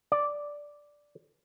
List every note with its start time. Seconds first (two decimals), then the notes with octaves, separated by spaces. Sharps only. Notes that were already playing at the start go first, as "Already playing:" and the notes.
0.12 D5